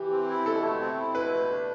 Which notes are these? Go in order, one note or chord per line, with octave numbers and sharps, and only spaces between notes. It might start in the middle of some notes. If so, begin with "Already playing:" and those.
Already playing: E3 G4
C4
E4
B2 A4
A3
C4
E4
B2 B4
A3
D4